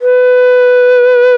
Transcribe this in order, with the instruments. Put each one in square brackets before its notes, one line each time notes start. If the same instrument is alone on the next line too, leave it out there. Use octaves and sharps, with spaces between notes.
[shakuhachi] B4